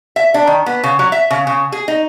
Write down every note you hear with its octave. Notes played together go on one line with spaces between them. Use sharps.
E5
D4
D#3
B3
C#3
F#3
E5
C#3
C#3
G#4
D#4